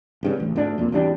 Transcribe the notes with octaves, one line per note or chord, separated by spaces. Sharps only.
G#1 G2 C#3
A1 D2
D2 G#2 D4
F2 A#2
G#1 E2 G3 D4